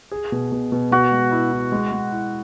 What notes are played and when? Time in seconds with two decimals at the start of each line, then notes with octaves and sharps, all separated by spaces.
0.11 G#4
0.32 B2
0.52 B2
0.72 B2
0.91 B2 F#4
1.11 G#3
1.31 E4
1.52 E4
1.72 G#3
1.92 G#3
2.11 E4